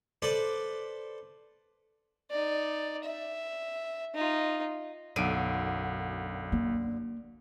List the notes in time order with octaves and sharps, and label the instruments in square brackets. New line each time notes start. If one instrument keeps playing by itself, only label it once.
[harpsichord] A4 B4 C5 D5 C6 D6
[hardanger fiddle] D#4 D5
E5
D#4 F4
[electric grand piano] B1 D7 D#7 [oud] F#2 D3
[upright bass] A#3